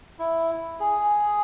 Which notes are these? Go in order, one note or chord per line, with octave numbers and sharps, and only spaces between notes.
E4
G#4